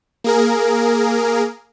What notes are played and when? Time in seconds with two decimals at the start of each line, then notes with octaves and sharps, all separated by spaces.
0.24 A#3 G#4 A#4